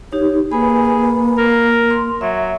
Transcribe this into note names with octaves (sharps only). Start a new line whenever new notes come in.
D#4 G4 C#5
A#3 G#4 B4 G#5 B5
A#4
C6
F#3 E5